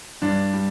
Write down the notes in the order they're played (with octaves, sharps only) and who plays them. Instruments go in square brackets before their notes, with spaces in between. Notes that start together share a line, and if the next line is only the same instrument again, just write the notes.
[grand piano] G2 D4
G3